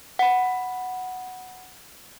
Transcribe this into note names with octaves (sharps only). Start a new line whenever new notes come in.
F#5 B5